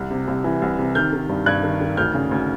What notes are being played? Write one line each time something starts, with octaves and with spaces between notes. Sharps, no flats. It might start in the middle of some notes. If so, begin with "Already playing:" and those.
Already playing: C2
C3
C2
E3
C2
C3
D#3 F6 G6
D#3
G2
G2 F#6 G#6
D#3
D#3
D2 F6 G6
C#3
D2